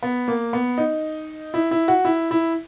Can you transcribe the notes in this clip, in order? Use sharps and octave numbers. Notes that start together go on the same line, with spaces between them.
B3
A#3
B3
D#4
E4
E4
F#4
E4
E4